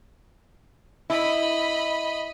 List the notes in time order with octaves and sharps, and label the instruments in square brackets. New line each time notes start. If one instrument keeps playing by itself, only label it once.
[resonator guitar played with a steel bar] E4 [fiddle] D#5 B5